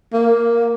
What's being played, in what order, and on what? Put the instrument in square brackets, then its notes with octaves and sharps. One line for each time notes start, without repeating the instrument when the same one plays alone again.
[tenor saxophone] A#3